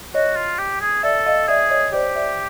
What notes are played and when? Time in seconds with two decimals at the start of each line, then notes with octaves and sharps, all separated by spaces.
0.14 F#4 C#5 D#5
0.36 F4
0.59 G4
0.81 G#4
1.03 A4 D5 E5
1.26 D#5 F5
1.48 G#4 D5 E5
1.70 C#5 D#5
1.93 G4 C5 D5
2.15 D5 E5